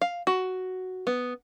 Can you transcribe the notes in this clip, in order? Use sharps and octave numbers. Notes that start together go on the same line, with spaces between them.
F5
F#4
B3